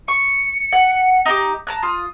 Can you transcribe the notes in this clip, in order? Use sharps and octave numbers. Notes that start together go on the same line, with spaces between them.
C#6 C#7
F#5
D#4 F#4 G4
A5 A#5 F#6
F4 D#6